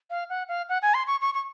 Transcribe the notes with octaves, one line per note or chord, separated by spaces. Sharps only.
F5
F#5
F5
F#5
G#5
C6
C#6
C#6
C#6